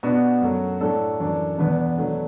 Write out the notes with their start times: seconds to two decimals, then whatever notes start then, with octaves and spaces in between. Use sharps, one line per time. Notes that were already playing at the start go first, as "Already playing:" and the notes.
0.03 B2 B3 D4 F#4
0.42 F#2 F#3 A3
0.81 A2 F#3 A3 D4 A4
1.20 F#2 E3 D4
1.58 E2 B2 B3 D4 B4
1.98 B2 F#3 A3 D4